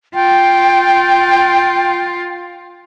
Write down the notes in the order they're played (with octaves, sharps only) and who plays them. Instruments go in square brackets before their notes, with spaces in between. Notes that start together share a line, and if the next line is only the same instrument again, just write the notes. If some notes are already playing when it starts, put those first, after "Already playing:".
[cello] F4 [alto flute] G5